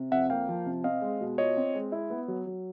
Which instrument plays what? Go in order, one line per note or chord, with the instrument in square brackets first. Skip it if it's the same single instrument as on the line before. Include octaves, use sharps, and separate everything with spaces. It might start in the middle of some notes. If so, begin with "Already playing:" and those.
Already playing: [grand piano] C3
[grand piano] F2 [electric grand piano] E5 F#5
[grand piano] A#3 [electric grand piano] F5 G5
[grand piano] F3
C3
[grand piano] C4 [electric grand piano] D#5 F5
[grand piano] G#3
B2
[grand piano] F4 [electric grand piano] C#5 D#5
[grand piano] C4
G#3
E4
B3
F#3
F#3